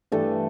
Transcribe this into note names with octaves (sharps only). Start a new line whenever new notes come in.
G2 E3 G3 A3 A4